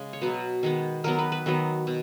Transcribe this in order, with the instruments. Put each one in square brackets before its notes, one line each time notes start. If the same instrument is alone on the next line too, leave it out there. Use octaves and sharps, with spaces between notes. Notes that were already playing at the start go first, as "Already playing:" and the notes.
Already playing: [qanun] C#3 G#3
C#5
B2 F#3 B3 B4
D#3 G#3 B3
D#3 F#3 B3 A#4
B4
B4
D#3 F#3 B3
B2